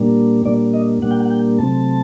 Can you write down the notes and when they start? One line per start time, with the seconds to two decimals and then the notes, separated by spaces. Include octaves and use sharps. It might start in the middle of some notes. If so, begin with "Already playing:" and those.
Already playing: A#2 G3 A#3 D4
0.45 A#2 G3 A#3 D4 D5
0.73 D#5
1.02 A#2 G3 A#3 D4 F#5
1.11 G5
1.20 F#5
1.30 G5
1.59 C3 F#3 A3 C4 A5